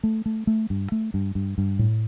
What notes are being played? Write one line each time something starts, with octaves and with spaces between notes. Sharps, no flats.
A3
A3
A3
G2
A3
G2
G2
G2
A2